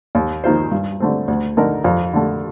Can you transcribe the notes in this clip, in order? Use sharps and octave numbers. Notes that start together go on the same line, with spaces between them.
D#2
D#3 A#3 F4 C5
G2
D3 A3 C4
D2
D3 A3 D#4 A#4
F2
D3 A3